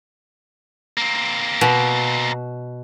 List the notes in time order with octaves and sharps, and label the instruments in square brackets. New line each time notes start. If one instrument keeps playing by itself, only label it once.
[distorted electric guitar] A#3 C4
[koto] B2